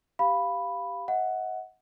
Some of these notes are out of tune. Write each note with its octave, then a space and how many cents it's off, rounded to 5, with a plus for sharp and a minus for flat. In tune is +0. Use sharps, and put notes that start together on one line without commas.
G4 +0 F5 -5 B5 +0
D#5 +40 F#5 +0